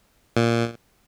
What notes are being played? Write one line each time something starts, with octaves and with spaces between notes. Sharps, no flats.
A#2